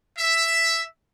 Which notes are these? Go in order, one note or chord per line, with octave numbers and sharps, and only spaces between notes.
E5